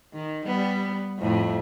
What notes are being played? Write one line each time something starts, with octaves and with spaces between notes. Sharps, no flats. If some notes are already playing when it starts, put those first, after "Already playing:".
D#3
G3 B3
F2 A2 A3